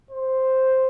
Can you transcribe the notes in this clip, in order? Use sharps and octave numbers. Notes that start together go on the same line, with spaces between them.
C5